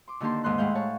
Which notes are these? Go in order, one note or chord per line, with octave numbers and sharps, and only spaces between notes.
C6 D6
D3 D#3 A#3 G4 A5 C6
D#2 G#2 D#5 C6 F#6
A2 G#3 F5 F#5 G6
C#5 A5